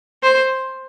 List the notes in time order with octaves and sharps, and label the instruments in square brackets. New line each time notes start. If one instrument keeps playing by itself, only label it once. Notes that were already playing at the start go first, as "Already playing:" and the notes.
[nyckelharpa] C5